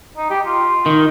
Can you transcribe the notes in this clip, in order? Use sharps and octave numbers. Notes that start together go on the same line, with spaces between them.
D#4
G4
F4
D#3